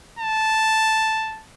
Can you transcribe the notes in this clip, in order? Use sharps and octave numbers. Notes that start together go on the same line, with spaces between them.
A5